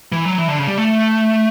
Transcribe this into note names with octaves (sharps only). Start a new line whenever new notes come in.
E3
F#3
E3
D3
C#3
G3
A3